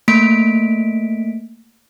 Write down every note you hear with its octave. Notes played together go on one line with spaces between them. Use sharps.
A3 A#3 B6 D7